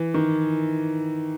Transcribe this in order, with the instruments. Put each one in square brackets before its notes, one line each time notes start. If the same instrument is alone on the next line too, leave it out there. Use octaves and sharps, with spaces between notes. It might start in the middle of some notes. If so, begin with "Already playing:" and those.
Already playing: [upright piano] E3
D#3